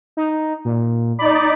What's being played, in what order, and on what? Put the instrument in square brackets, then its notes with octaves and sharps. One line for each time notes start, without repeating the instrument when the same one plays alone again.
[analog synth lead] D#4
A#2
[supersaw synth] D#4 D5 [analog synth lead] B5